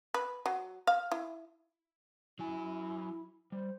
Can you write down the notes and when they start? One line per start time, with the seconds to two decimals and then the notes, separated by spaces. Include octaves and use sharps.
0.14 B4
0.46 F#3
0.87 F5
1.12 E4
2.39 F#3 E4 G#5
3.52 G3 C5